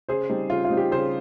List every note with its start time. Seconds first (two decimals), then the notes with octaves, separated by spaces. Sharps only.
0.08 C#3 G#4 C5
0.29 G3 C4 D#4
0.50 C#3 F4
0.65 F4
0.70 G3 C4 D#4
0.77 G4
0.91 C#3 G#4 C5